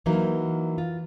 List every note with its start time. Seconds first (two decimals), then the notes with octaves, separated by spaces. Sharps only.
0.06 E3 F#3 A#3 D#4 A#4
0.78 F4